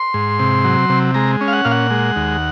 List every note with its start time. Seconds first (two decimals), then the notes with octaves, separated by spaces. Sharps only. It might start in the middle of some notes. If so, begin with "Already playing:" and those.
Already playing: C6
0.14 G#2
0.39 C3
0.64 F#3
0.89 C3
1.14 G#3 A#5
1.41 C#4
1.48 F5
1.53 F#5
1.65 A#2 F5
1.71 F#5
1.91 G#3
2.16 D#2